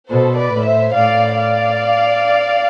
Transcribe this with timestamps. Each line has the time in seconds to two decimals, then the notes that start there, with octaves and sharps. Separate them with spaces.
0.10 B2 A4 C5
0.38 B4 D5
0.52 A2
0.66 C5 E5
0.94 A2 D5 F5
1.36 D5 F5